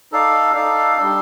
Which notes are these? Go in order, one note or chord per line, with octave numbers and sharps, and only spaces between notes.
D#4 A4 D5 F5
D#4 A4 D5 F5
G3 D4 A4